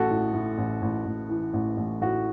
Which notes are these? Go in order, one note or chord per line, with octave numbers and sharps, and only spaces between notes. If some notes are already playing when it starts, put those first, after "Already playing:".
Already playing: A1 F#4 A4
A2
A2
A1
A1
A1
E3
A1
A1
A2 F#4